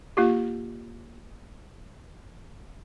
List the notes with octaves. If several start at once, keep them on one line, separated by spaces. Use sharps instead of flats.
A#3 F4 G4